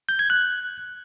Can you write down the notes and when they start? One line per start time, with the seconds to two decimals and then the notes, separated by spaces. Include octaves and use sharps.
0.09 G6
0.19 G#6
0.30 F#6